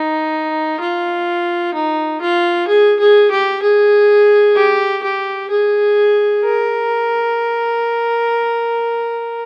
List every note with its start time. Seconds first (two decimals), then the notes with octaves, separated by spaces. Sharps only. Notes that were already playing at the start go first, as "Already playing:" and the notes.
Already playing: D#4
0.80 F4
1.74 D#4
2.21 F4
2.68 G#4
2.99 G#4
3.31 G4
3.62 G#4
4.56 G4
5.03 G4
5.50 G#4
6.44 A#4